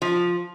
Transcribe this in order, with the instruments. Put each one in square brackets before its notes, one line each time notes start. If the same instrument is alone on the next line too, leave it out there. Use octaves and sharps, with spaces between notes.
[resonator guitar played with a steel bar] F3